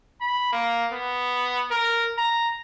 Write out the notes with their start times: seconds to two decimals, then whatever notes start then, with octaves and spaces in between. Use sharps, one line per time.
0.21 B5
0.52 A#3
0.92 B3
1.71 A#4
2.18 A#5